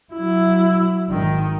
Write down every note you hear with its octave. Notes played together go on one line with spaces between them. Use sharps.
F#3 E4
G#1 D#3